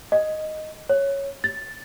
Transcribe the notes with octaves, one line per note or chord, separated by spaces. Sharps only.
D#5
C#5
A6